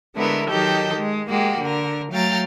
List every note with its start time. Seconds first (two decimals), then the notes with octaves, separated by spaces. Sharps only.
0.14 D3 G#3 A3 B3 E4 A#4
0.49 D#3 F#3 G4 A4 D#5 G6
0.96 G#3
1.29 G#3 A#3 F#4 G4
1.60 D3 A#4
2.11 F#3 A3 F5 G5 A#5 A6